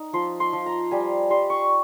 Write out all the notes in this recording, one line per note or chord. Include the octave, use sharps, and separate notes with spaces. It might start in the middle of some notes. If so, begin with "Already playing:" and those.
Already playing: D#4
F3 C6
C6
F3
A#5
G3 G#5
G3 C6
C#6